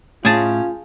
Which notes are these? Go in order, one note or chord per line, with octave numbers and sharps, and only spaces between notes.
A2 C#4 F4 G#4 A5